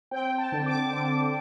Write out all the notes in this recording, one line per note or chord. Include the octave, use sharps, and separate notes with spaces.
C4 G5
A5
D3
D6
D3